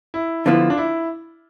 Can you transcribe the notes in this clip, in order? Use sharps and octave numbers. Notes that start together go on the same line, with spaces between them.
E4
D3 F3 B3 E4 F4
D4
E4